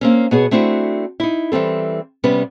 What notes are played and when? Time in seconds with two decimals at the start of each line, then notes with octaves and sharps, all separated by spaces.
0.01 A#3 C4 C#4
0.31 B2 B3 G#4 C#5
0.51 A3 C4 D4 E4 F#4
1.20 D#4 E4
1.52 E3 G3 C4 A4
2.24 C3 G3 B3 C#4 B4